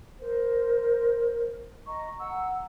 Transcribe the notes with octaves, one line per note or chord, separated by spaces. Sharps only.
A#4 C5
D#5 A#5 C#6
F#5 A#5 E6